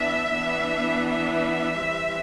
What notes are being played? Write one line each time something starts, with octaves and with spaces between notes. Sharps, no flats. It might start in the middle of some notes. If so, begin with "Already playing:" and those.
Already playing: E3 B3 D4 E5
E3 B3 D4
E5
E3 G3 C4